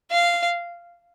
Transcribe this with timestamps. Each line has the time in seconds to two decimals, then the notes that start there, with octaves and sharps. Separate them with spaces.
0.11 F5